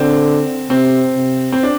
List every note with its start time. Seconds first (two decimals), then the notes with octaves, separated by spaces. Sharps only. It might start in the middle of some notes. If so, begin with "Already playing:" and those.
Already playing: D3 C4
0.70 C3 C4
1.16 C3
1.52 C4
1.63 D4